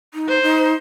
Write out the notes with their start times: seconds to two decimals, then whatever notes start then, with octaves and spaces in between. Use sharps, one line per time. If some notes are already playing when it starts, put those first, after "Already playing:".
0.14 D#4
0.28 C5
0.43 D#4